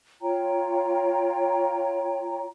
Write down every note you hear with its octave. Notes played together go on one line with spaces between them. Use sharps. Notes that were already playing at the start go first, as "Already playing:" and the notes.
F4 C#5 G5 A#5